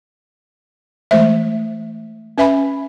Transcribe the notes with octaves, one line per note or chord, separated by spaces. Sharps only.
E3 G#3 A3 C5 E5
C#4 B4 E5 G#5 B5